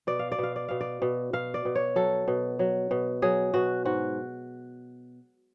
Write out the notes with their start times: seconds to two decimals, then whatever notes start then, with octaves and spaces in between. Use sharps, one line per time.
0.07 B2 D5
0.19 F5
0.32 D5
0.38 B2 F5
0.56 D5
0.68 B2 F5
0.81 D5
1.02 B2
1.33 B2 F5
1.54 D5
1.65 B2
1.75 C#5
1.96 F#3 A4
2.28 B2
2.59 F#3
2.91 B2
3.22 F#3 G#4
3.54 B2 F#4
3.85 G#2 F#4